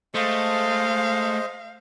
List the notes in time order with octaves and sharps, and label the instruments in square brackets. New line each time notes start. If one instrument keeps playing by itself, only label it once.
[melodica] G#3 C5 D#5 [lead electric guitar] A3 [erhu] F5